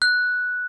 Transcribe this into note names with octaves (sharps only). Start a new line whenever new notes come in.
F#6